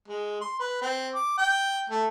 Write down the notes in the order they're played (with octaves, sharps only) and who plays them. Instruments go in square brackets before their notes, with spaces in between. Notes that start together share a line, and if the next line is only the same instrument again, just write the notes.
[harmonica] G#3
C6
B4
C4
D6
G5
A3